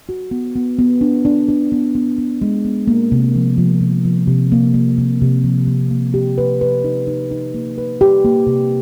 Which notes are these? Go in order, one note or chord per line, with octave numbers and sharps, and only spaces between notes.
F#4
B3
B3
B3
D4
D4
D4
B3
B3
B3
G#3
B3
A#3
C3
F3
F3
C3
F3
C3
A#3
A#3
C3
C3
F3
A#3
A#3
G4
B4
B4
D#4
D#4
D#4
A#3
B4
G4
A#3
C3